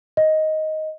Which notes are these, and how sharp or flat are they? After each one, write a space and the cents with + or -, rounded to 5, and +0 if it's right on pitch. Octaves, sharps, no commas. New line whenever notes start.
D#5 +10